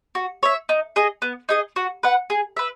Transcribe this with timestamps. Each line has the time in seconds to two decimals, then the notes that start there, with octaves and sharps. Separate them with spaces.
0.15 F#4
0.43 C#5 E5
0.69 D#4
0.96 G#4 D#5
1.22 B3
1.49 D#4 G#4 D#5
1.76 F#4
2.03 B4 F#5
2.30 G#4
2.57 B4 E5